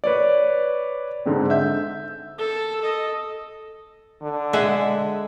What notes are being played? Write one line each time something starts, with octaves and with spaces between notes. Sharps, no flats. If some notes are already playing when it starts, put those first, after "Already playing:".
B4 C#5 D5
G#2 D3 G#3 C4
E5 G6
A4
A4 D#5
D3
G#3 E5 F#5